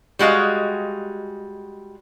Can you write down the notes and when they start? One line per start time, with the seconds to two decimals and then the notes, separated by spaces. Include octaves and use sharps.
0.19 G3 G#3 F#4 D#5 F5